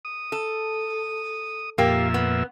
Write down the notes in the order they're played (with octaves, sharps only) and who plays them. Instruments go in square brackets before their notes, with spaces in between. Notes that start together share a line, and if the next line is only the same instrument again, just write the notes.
[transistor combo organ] D#6
[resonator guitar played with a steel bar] A4
[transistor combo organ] F2 A#2 E5 [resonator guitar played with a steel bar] A#3 G4
[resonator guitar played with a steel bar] B3